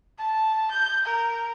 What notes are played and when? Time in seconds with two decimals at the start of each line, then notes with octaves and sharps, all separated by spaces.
0.19 A5
0.71 G6
1.05 A#4